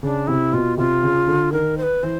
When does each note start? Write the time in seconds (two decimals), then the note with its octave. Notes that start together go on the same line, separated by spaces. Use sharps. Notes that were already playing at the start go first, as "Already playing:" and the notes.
0.03 C#3 D4
0.27 C3 E4
0.52 B2 F4
0.78 C3 F4
1.03 C#3
1.27 D3
1.53 D#3 A#4
1.77 C5
1.82 B4
2.03 E3 C5